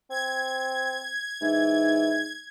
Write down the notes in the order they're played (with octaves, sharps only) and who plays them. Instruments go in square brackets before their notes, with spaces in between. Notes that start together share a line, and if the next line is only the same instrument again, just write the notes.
[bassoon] C4 [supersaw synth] G#6
[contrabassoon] G#2 [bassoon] E3